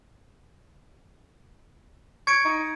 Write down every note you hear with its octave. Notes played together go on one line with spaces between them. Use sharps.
C#6 G#6 C#7 D7
D#4